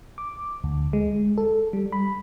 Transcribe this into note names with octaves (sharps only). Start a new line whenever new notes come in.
D6
D2
G#3
A4
G3
B5